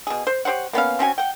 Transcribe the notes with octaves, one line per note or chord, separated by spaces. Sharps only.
B2 G#4
C5
G4 C5 C#5 F#5
A#3 B3 C#4 F5
C4 C#4 F#4 G#5
F#5 G5